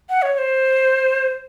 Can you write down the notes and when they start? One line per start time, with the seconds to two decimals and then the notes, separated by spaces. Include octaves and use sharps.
0.10 F#5
0.22 C#5
0.33 C#5
0.38 C5